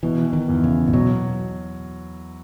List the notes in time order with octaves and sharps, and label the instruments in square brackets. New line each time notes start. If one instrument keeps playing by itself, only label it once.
[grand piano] B2 [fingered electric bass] E3
[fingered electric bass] D#3
[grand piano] E2
[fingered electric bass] C#3
A#2
[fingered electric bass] B2 [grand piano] F#3